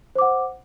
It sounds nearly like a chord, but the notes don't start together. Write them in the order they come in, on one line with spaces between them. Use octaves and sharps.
C5 D6 F#5